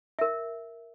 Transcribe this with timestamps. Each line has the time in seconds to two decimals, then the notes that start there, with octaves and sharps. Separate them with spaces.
0.19 A#4 E5